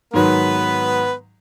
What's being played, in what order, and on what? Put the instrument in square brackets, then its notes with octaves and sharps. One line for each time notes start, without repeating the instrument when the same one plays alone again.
[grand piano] G#2 D#3 F#3 [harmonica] B3 B4